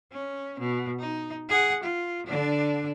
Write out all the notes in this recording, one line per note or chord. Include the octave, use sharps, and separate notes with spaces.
C#4
B2
D#4
G#4 F#5
F4
D3 D4